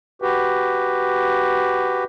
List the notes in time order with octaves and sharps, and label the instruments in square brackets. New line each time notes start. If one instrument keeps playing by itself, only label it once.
[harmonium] F#4 G4 B4